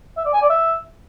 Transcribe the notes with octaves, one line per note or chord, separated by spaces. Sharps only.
E5
D5
G#5
D5
E5